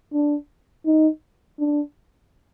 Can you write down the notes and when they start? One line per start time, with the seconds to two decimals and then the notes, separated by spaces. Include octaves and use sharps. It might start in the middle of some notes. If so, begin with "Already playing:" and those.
0.13 D4
0.86 D#4
1.59 D4